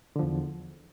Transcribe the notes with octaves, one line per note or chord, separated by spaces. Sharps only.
E2 D3 F3